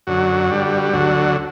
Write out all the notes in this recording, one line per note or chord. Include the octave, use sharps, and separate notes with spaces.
F#2 D3 F#3 F#4
G2 D3 G3
D2 D3 F#3